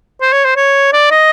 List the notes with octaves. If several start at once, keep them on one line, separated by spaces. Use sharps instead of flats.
C5
C#5
C5
C#5
D5
D#5